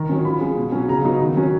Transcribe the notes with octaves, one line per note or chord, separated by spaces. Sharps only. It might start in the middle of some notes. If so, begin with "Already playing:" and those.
Already playing: D#3 A#5
F#3 C#4
F3 B5
G#3 C#4
B2
F#3 C#4
C#3 A#5
F#3 B3 D#4
D#3
F#3 C#4